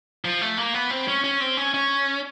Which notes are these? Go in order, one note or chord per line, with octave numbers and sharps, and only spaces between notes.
F3
A3
A#3
B3
C4
C#4
C#4
C4
C#4
C#4